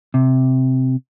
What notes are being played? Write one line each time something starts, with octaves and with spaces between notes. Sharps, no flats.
C3